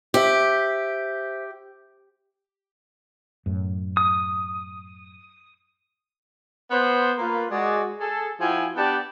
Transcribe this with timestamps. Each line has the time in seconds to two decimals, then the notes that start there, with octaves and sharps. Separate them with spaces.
0.14 G4 C5 E5
3.46 F#2 A2
3.97 D#6
6.71 B3 C5
7.18 A#3 F4 B4
7.50 G#3 F#4 D5
8.00 G#4 A4
8.40 F3 E4 F#4 G5 G#5
8.76 B3 D4 G4 D5 G5 A5